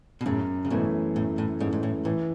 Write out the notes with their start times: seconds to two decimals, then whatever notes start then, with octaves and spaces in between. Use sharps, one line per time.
0.21 B2
0.26 F#2 A2 C#3
0.65 C#3
0.71 G#2 B2 E3 A3 C#4
1.15 F#2 A2
1.38 A2
1.60 G#2 E3 A3 C#4
1.73 G#2
1.83 A2
2.05 A2 E3